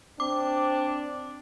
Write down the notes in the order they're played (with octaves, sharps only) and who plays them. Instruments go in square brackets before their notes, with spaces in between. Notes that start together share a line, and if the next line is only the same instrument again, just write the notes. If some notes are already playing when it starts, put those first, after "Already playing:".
[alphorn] C4 [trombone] D4 [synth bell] D6